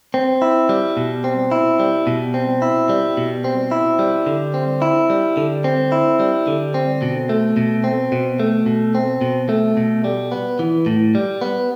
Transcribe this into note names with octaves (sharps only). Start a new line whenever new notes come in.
C4
E4
G3
B2
C4
E4
G3
B2
C4
E4
G3
B2
C4
E4
G3
D3
C4
E4
G3
D3
C4
E4
G3
D3
C4
B2
A3
B2
C4
B2
A3
B2
C4
B2
A3
B2
G3
B3
E3
A2
G3
B3